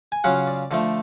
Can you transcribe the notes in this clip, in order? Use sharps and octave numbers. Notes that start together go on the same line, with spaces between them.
G#5
C#3 F#3 C#4 F4 F#5
D5
D3 F3 A3 D5